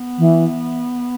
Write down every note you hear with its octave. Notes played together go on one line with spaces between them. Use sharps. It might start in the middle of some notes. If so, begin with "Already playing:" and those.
Already playing: B3
E3